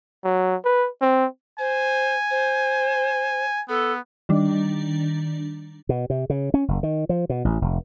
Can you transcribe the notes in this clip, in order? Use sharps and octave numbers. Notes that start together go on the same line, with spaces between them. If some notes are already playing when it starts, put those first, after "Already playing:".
F#3
B4
C4
C5 G#5
C5
B3 A4
D#3 G3 D4
B2
C3
C#3
C#4
F#1
D#3
F3
B2
A1
F1